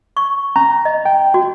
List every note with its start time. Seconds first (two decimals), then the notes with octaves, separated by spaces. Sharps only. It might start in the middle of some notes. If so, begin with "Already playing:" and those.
0.17 C#6
0.56 C#4 A#5
0.85 D#5
1.05 G5
1.34 F#4